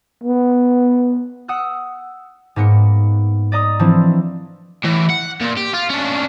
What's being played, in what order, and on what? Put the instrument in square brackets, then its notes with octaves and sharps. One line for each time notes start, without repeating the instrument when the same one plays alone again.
[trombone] B3
[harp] F#5 D#6 E6 F#6
G#2 A#3 B3 C#7
D5 D#5 A#5 D#6
E3 F3 A3 C4 D4 E4
[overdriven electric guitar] A2 E3
F#5
A#2
G4
F4
C#4 D4